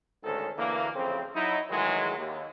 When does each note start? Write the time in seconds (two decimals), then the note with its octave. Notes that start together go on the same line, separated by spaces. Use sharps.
0.24 A1 D2 G#2 D#3 C#4 A4
0.57 D2 D3 E3 A#3
0.95 A1 F2 C#3 C4
1.34 F#3 D#4 E4
1.70 A2 D#3 E3 F#3 G#3
2.17 D#2